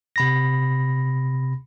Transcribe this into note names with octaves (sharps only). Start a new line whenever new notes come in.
C3 B5 A#6